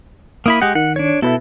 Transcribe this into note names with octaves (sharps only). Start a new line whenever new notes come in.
A#3 E4 B5 D#6
G#3 G4 F#5
D#3 F#5
D4 C#5
B2 E4 A4 B4 E5